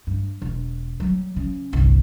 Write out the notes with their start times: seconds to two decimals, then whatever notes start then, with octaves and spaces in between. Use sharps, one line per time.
0.07 G2
0.42 E1
1.00 F#3 G3
1.36 C#3
1.73 G1 C2